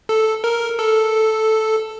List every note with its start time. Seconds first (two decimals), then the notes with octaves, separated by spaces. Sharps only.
0.09 A4
0.44 A#4
0.79 A4